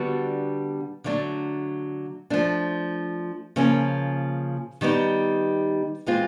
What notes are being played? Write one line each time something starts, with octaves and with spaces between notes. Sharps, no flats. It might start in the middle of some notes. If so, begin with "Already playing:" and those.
Already playing: D3 G3 B3 D4 F#4
D3 F#3 A3 D4
F3 A3 D4
C#3 F3 A#3 C#4
D#3 G3 B3 D#4
E3 G#3 C4 F4